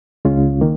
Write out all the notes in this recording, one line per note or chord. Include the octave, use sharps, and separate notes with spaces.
C#2 C#3 G#3 C#4 F4
D#3 A#3